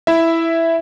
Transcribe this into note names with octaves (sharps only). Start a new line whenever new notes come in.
E4 E5